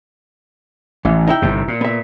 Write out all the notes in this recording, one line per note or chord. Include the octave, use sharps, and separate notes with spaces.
A1 E3
D#4 E4 G5
G1 G2 C3
A#2
B3 E5